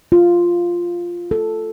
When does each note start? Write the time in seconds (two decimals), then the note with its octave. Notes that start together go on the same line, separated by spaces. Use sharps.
0.12 F4
1.31 A4